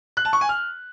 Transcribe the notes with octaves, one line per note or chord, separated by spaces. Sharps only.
F#6
A5
C#6
G#5
F6